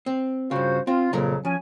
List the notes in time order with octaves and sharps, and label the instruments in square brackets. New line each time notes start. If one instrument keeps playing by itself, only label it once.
[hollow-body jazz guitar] C4
[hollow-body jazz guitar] G2 C#3 [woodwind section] F4 F#4 C5
[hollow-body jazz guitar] C4 [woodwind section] F4
[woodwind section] F2 C#3 F#3 [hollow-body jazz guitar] A#2 A#4 A#5
[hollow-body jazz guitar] F3 [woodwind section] C#4 G#5